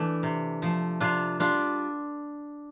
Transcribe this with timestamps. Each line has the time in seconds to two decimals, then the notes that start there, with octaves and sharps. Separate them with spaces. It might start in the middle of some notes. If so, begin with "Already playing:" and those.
Already playing: E3 A3 D4
0.23 C3
0.62 F3 A3
1.00 C3 D4 F4
1.40 G3 D4 F4